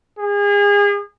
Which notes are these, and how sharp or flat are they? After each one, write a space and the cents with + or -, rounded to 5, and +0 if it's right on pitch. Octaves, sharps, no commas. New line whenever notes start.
G#4 -35